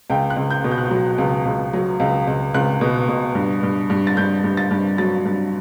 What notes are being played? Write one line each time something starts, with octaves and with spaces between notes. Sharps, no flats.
C#2 G5
F#6
C#2
G6
B2
G6
F#6
G6
F#3
C#2
C#2
F#3
C#2
C#2
C#2 F#6
B2
B2
G2
G2
G2
A6
G2 G6
G2
A6
G2
F#3 A6
G2